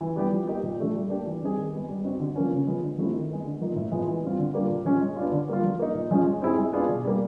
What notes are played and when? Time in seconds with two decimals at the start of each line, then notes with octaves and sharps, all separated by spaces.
0.01 E3
0.16 G3 B3 E4 G4
0.32 F3
0.47 A#3 D#4 G4
0.63 A#2
0.80 F3 A3 D4
0.95 G3
1.10 A#3 D4 G4
1.26 E3
1.42 G3 C4 D#4 G#4
1.57 D#3
1.73 G#3 B3
1.89 G3
2.04 C4 D#4 F#4
2.20 D3
2.36 F3 A#3 C#4
2.51 C#3
2.67 F3 G#3 B3
2.83 D3
2.98 F3 A3 C4 E4
3.13 D#3
3.29 G#3 B3
3.45 D3
3.61 F3 A#3 D#4
3.76 A2
3.91 F3 G#3 B3
4.08 E3
4.23 G3 C4 F4
4.39 D3
4.54 G3 A#3 D4 F4
4.70 A#2
4.85 F3 G#3 C#4
5.01 G#3
5.16 B3 D4 F4
5.32 D3
5.48 G3 A#3 D4 F4
5.64 F3
5.80 A#3 D#4
5.95 A#2
6.11 F3 G#3 C#4
6.26 G#3
6.42 C4 E4 G#4
6.58 G#3
6.73 B3 D4 F4 G#4
6.89 B2
7.05 G3 A#3